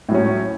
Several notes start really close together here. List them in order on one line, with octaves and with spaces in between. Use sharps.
A2 F#3 C#4